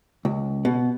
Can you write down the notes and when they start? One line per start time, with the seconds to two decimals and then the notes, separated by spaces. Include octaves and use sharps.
0.25 C#2
0.65 B2